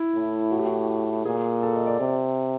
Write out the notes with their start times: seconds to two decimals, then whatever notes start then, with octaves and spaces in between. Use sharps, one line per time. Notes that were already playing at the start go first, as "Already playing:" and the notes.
Already playing: E4
0.14 A2
0.52 F#4
0.59 G4
0.66 F#4
1.25 A#2 G#4
1.63 A4
1.74 D#5
1.87 D5
2.00 C3